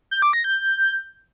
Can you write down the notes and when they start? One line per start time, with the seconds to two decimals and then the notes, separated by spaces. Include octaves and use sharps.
0.11 G6
0.22 D6
0.33 A#6
0.44 G6